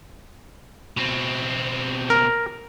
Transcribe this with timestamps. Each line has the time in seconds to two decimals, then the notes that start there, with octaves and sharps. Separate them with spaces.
0.97 B2 C4
2.10 A#4